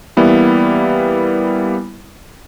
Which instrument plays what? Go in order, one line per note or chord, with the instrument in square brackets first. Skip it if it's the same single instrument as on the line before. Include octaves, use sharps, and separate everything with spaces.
[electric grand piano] E3 G3 A#3 B3 E4